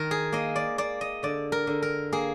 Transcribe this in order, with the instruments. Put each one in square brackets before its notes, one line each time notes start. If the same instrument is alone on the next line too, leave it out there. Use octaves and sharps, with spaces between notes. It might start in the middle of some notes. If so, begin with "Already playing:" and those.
Already playing: [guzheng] D#3 A#4
G#4
A#3 D#5
D5
A#3 D5
D#5
D3 D5
A#4
D3
A#4
A#3 G#4